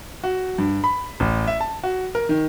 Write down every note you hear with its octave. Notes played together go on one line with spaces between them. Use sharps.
F#4
G2
B5
A1
E5
A5
F#4
A#4
D#3